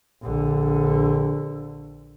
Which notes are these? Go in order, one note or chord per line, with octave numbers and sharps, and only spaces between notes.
A#1 D3